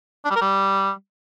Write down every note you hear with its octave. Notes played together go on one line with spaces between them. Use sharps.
D4
G3
A#4
G3